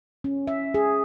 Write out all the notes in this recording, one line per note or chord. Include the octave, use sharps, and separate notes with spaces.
C#4
E5
G#4